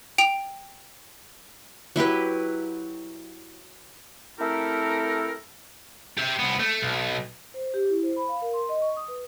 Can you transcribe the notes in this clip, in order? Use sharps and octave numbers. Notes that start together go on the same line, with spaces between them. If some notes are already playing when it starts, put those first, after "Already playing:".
G5 D7 F7
F#3 E4 G4 B4
A3 C4 E4 G4 A4 A#4
G4 E5
C2 B3
A3
B1
C5
G4
E4
C5
B5
F5
A#4
C6
D#5
C#6
D#6
B4